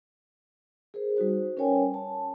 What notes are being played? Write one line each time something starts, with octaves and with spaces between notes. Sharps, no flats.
G#4 A#4 C5
G3 D#4 F#4 C5
C#4 A#4 B4 C#5 G5 G#5
A5